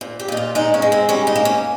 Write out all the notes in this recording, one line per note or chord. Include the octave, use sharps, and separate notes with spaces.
A#2
G4
A#2 D#4
F4
G#3 D#4
C#4
G#3
C4
G3 C#4
D#4
A#3
C#4